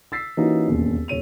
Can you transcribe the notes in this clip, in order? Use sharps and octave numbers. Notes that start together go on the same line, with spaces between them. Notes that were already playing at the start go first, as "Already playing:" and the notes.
E6 A6 B6 C7
E3 A#3 C#4 D#4 F#4 G4
E1 A1 D#2
D#1 C#5 D#7 F7